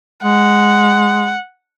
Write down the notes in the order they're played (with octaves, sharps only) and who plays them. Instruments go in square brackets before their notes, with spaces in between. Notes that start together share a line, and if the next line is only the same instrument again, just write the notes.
[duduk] G#3 [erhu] F#5